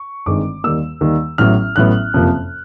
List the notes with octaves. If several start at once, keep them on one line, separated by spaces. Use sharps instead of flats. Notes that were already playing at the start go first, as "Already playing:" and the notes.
Already playing: C#6
G1 G2 D#3 G#3 C4 D6
D#2 D#3 G3 A#3 E6
D#2 D#3 G3 A#3
A1 A2 F#3 B3 F6
A1 A2 F#3 B3 F#6
F#1 F2 C3 F3 A#3